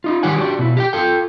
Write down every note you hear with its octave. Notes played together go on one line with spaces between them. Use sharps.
D#4 F4
D#3 G3 G4 C#5 F#5 G#5
D4 F#4 G4
B2 E4
G4 D#5 G5
F4 A4 G5